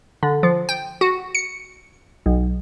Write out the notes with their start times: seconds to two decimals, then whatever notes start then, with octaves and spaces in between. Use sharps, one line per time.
0.23 D3
0.43 F3
0.69 G5
1.01 F#4
1.35 C#7
2.26 B1